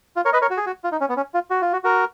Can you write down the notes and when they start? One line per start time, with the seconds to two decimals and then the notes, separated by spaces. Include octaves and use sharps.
0.16 F4
0.25 A#4 C#5
0.33 B4 D#5
0.42 A#4 C#5
0.50 F#4
0.57 G#4
0.66 F#4
0.84 F4
0.92 D#4
1.01 C#4
1.09 B3
1.17 C#4
1.34 F4
1.50 F#4
1.62 F4
1.73 F#4
1.84 F#4 A#4